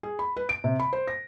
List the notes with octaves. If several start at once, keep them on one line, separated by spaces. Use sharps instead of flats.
G#4
B5
B4
D7
C3
B5
C5
A#6